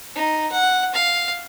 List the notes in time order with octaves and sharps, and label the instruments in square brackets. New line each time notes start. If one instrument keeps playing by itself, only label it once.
[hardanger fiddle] D#4
F#5
F5